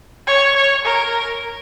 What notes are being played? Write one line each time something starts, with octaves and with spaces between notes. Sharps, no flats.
C#5
C#5
A#4